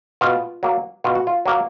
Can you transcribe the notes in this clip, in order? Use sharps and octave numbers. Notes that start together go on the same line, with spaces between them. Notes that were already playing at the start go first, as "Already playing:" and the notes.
B2 F4
F#3 A#3
B2 F4
F#4
F4
F#3 A#3